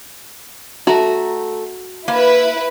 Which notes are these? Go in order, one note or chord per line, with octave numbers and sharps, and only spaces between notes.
A3 F#4 A#5
A#3 E4 B4